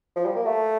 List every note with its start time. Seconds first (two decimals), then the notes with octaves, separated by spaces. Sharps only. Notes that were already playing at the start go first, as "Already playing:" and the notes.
0.16 F3
0.25 G3
0.36 A#3
0.46 A3